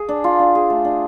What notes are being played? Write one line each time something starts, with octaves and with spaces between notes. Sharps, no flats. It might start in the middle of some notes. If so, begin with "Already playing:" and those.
Already playing: G#4
D4
F4
D4
G#4
A3
D4